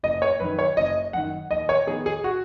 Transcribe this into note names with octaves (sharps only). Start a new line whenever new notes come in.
F#1 D#5
C#5
F#2 D#3 B4
C#5
F#1 D#5
F#2 D#3 F#5
D#2 D#5
C#5
D#3 B3 D#4 G#4
G#4
F#4